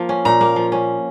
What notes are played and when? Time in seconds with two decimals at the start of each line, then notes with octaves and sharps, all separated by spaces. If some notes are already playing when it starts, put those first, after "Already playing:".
Already playing: F3 A#3
0.09 C#4
0.25 A#2 A#5
0.41 A#3
0.56 F3
0.72 C#4